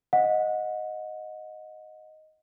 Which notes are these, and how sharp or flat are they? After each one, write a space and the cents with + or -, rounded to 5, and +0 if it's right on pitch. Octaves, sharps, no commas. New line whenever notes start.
D#5 +0 F#5 -25